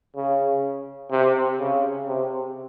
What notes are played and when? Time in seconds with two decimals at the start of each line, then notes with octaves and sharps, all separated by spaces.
0.16 C#3
1.11 C3
1.59 C#3
2.07 C3